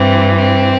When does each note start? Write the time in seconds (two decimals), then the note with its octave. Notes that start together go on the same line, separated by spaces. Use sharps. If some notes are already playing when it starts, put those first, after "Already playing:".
Already playing: G2 E3 C4
0.37 C4